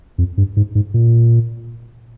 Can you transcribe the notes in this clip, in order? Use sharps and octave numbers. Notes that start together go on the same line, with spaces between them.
F2
G2
G#2
G#2
A#2